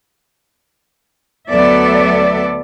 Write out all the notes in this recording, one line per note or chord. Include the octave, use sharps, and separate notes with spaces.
D2 F#3 B3 A4 D5 E5